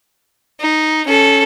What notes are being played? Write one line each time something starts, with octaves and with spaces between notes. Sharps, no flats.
D#4
C#4 A4